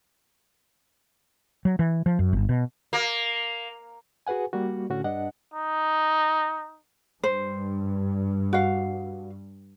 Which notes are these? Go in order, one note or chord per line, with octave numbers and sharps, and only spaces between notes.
F#3
E3
F3
F#2
G1
B2
A#3
F#4 G#4 B4 F#5 G#5
G3 A#3 F#4
A2 D3 C#4 F#4
G2 D4 D#5 F#5
D#4
G2 C5
F#4 F5